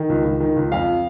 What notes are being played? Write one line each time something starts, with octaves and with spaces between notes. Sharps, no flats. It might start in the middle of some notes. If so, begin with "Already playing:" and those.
Already playing: D#3
C#2
C#2
D#3
C#2
F2 F5